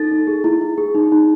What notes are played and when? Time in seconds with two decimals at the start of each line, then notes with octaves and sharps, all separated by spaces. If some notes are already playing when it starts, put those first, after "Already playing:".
Already playing: D#4 A4 A6
0.11 D#4
0.27 G#4
0.44 E4
0.61 E4
0.78 G#4
0.95 D#4
1.12 D#4